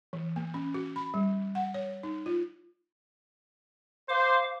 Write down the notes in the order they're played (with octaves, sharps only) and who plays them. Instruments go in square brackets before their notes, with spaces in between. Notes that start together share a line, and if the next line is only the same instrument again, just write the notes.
[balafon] E3
A#3
C#4
F#4
B5
G3
F#5
C#5
D#4
F4
[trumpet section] C5 [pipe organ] F5 D6